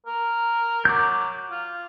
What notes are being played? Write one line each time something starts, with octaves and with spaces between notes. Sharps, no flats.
A#4
F#3 D6 G6
F4